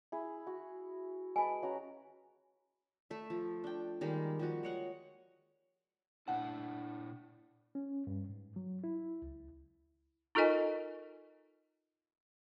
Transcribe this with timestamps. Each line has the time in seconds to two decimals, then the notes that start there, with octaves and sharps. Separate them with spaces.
0.12 E4 G#4
0.47 F#4
1.36 G#3 B4 G#5 A5
1.62 C#4 F#4 A#5
3.10 A3 E5
3.30 F3
3.64 D4 G5
4.01 D#3 G3 G#3 A#3
4.39 F3 G3 F#4
4.63 G#3 C#5 F#5
6.28 A#2 D4 E4 F#5 A5
7.75 C#4
8.07 G2
8.29 G#2
8.56 F#3
8.84 E4
9.22 C#2
10.35 D#4 F4 A4 A#4 D#5 G#5